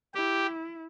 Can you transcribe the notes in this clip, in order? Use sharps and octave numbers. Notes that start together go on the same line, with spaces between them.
E4 G4